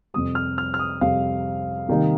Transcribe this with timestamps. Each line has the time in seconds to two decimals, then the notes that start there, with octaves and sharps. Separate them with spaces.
0.14 F2 C3 G3 D#6
0.35 F6
0.58 F6
0.74 F6
0.79 D#6
1.01 F2 C3 G3 F5
1.89 C3 D#3 G3 A#3 D#4